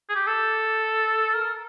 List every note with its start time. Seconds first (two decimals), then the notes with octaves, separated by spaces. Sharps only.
0.09 G#4
0.15 G4
0.27 A4
1.34 A#4